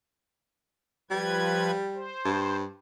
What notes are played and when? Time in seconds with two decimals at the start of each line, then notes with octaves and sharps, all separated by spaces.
1.11 F3 G3 B4 G#6
1.95 C5
2.25 G2